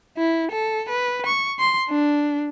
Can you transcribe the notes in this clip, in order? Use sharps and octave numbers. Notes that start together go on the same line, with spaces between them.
E4
A4
B4
C#6
C6
D4